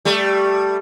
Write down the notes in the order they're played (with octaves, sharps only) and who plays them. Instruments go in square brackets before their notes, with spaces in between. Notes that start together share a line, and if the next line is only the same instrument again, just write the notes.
[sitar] G3 A3